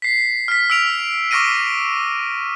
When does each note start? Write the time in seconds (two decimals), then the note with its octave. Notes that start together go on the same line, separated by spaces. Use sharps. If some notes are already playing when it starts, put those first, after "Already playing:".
0.02 B6 C7
0.48 F6 B6
0.70 E6 F6 D7 F7
1.31 C#6 D6 F6 A#6 D7 D#7